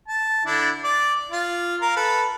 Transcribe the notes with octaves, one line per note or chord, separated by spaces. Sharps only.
A5
D3 D4 E4
D5
F4
A#4 F5
A4 B4